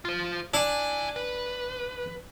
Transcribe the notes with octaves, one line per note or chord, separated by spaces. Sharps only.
F4 C5
D4 E4 G#5
B4